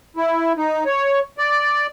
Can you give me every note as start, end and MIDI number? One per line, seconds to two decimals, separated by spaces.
0.17 0.53 64
0.57 0.84 63
0.86 1.20 73
1.38 1.87 74